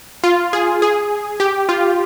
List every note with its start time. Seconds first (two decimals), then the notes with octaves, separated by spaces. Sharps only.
0.24 F4
0.53 G#4
0.82 G#4
1.40 G4
1.69 F4